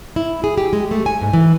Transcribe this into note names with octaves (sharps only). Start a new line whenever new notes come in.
E4
G#4
G4
G#3
A3
G#5
G#2
E3